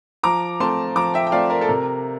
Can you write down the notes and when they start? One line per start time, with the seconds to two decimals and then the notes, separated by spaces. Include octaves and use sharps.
0.23 F3 A#5 D6
0.60 A3 C4 F4 A5 C6
0.96 F3 A#5 D6
1.14 E5 G5
1.27 G5
1.32 A3 C4 F4 D5 F5
1.50 A#4 D5
1.61 A4
1.69 C3 A#4